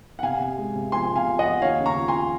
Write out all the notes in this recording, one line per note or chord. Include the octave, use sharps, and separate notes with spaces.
F#5
C3 F5 G#5
C3
G#3
C3
F3 G#5 C6
C3
F5 G#5
F3
D#5 F#5
F3
D#2 C#5 F5
C#3
A#5 C#6
F3
G#5 C6